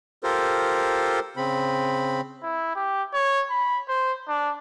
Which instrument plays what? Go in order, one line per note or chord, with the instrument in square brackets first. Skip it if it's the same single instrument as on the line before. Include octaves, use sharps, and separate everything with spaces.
[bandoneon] F4 G4 A4 A#4 C5
C#3 C4 B5
[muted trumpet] E4
G4
C#5
B5
C5
D4